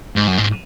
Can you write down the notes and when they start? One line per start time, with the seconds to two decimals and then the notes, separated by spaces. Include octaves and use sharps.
0.16 G#2
0.28 F#2
0.38 G#2